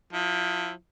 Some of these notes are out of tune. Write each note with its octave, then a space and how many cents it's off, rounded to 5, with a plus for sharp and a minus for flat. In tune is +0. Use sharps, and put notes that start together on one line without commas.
F3 +35 E4 +10